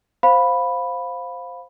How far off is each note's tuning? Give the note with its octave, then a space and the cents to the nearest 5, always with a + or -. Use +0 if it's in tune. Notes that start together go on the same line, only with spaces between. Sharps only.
C5 +0 F5 +15 B5 +0